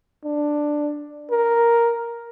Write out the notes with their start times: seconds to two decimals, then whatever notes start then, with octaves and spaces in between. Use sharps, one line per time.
0.24 D4
1.31 A#4